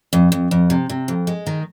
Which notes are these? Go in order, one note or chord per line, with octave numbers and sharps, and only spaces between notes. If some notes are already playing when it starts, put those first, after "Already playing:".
F2
F2
F2
C3
C3
F2
G#3
D#3